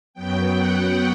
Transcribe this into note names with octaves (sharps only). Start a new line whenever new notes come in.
F#2 F#3 B3 G5
F#5